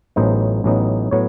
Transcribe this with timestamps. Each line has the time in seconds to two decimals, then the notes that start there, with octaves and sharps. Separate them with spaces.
0.16 A1 A2 F#3 B3 D#4 C5
0.64 A1 A2 F#3 B3 D#4
1.11 A2 F#3 B3 C#5